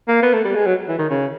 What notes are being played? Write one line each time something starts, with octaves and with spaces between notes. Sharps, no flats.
A#3
B3
A3
G3
G#3
F#3
E3
D#3
C#3